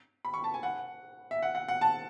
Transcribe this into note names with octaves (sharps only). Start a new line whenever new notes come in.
B5
C#6
A5
G#5
F#5
E5
F#5
F#5
F#5
A5